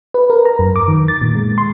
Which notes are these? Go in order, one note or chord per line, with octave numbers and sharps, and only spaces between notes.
B4
A#4
A#5
F#2
D6
D#3
A6
A#2
G#3
C6